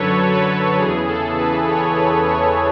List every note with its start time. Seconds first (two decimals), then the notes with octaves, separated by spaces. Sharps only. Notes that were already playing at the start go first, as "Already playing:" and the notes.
Already playing: F#2 D3 F#3 A4 B4 C#5
0.32 B4
0.78 E2 C#3 E3 G#4
1.08 A4
1.38 B4
1.69 C#5
1.98 B4
2.28 C#5